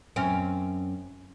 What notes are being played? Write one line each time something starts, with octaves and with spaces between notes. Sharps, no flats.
F#2 C4 C#4